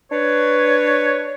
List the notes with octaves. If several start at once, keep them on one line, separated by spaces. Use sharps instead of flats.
D4 B4 C#5